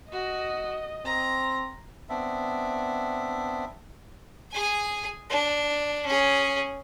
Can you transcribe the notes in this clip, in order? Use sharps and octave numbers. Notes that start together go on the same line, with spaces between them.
F#4 D#5
C4 A#5
B3 C4 D4 E5
G#4 G#5
D4
C#4 G#4